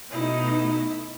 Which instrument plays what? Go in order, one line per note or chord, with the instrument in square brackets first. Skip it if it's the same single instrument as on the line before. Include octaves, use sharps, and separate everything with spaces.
[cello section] B2 A3 D#4 [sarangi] E4